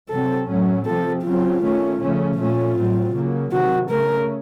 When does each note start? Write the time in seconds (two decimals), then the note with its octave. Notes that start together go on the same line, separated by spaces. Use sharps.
0.10 C3 F#3 C4 A4
0.47 A2 F#3 A3 C#4
0.86 C3 F3 C4 A4
1.24 C#3 F#3 C4 F4
1.62 D#3 A3 C#4
2.00 C#3 F3 A3 C#4
2.37 A#2 A3 C#4 F4
2.77 A2 F#3 C4
3.14 C#3 F#3 A#3
3.52 C3 D#3 F#3 F#4
3.90 C#3 A3 C#4 A#4